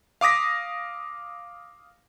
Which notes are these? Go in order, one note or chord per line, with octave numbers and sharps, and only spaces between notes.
F5 D6 D#6 A#6 B6